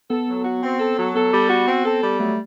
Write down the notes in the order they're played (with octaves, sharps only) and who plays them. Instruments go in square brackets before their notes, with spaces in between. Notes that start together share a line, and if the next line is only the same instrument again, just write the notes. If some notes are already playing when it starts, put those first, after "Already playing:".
[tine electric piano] B3 [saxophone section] A4
[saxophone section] F#3
F#4
C4
A4
F#3
[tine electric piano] B3 [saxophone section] A4
[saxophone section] G3
F#4
C4
A4
G3
[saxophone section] F#3 [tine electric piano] A3